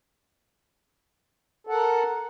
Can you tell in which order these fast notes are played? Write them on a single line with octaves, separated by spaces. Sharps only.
A4 F#5 A#4